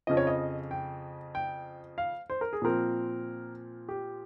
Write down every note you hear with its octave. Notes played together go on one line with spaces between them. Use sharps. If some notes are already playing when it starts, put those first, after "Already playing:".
F2 C#3 F3 D#5
C#5
D#5
G5
G5
F5
C5
A#4
G#4
A#2 F3 C4 A#4
G4